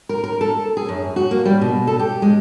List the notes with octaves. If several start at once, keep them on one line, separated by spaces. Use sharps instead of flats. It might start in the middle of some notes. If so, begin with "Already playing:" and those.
A#4
A#4
A4
G#4
F#2
F#4
A#3
G3
B2
A4
G4
G#3